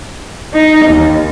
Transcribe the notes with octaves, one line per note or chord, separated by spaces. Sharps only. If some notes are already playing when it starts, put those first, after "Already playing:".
D#4
D#2